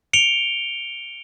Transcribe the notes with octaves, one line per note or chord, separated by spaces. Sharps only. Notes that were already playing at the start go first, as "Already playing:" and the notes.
C#7 D7 F7 G7